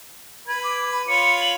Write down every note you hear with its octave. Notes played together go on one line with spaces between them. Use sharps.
B4 G#6
D6
B5
F4 C#5 B5 C#7
F#7